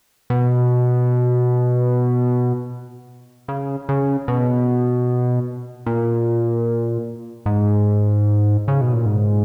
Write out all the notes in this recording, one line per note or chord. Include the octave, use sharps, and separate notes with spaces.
B2
C#3
C#3
B2
A#2
G#2
C#3
B2
A#2
G#2